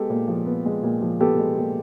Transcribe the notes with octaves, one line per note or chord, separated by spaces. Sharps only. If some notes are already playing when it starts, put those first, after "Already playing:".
Already playing: G#3 B3 G4 A4
A#2
F3
B3
G#3
A#2
F3
B3 G4 A4
G#3
A#2